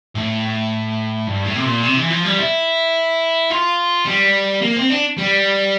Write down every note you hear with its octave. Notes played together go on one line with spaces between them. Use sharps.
A2
G2
A2
C3
A#2
C3
E3
F3
G3
E4
F4
G3
A#3
C4
D4
G3